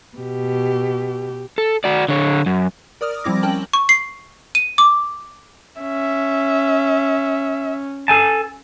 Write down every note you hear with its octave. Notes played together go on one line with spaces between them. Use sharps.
B2 G4
A4
F#4 D5
D3 C#5
F#2
A#4 D5 D#6 F6
F3 G3 C4 E4 D6 A#6
C#4 A#4 G5 A5 F#7
C#6
C7
D#7
D6
C#4 E5
A4 G#5 A5